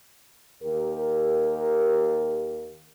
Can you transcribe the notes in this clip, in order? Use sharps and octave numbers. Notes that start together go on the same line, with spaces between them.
D#2 G4 A#4